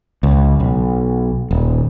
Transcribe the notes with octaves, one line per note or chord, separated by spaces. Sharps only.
C#2
B1
D#1